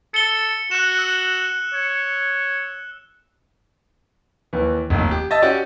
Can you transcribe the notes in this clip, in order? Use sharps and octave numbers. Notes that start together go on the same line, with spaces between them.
A4 C#7 G7
F#4 F#6 E7
E6
C#5
D#2 E3
F1 D#2
G4
D#5 E5 A5 E6 A6
C#4 F#4 G4 D5